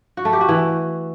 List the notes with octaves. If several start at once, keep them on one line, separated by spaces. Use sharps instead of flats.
F#4
A3
G4
F#4
E3